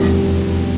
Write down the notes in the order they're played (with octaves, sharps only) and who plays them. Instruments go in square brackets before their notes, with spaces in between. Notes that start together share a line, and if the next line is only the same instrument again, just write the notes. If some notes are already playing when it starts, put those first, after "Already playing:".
Already playing: [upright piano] F1 E2 E3 G3